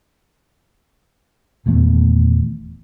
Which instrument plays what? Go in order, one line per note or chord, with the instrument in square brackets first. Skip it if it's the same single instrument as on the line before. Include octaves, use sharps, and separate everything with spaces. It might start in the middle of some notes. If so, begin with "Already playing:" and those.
[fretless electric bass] D#1 E2 A3